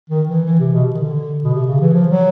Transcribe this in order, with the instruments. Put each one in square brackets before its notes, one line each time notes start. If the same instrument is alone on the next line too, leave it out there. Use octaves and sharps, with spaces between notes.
[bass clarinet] D#3
E3
E3
C3
B2
D#3
D3
B2
C3
C#3
E3
F3
F#3